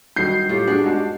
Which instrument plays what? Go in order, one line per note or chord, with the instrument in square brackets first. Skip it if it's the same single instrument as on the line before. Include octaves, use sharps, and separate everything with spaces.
[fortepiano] G2 D#3 F#3 [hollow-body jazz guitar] F#4 [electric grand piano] G6 C7
[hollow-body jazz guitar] A2 A3 F4 [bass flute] G4
[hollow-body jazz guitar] D4 [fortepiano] F#4 G#4
[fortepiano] G#2 F#4 A5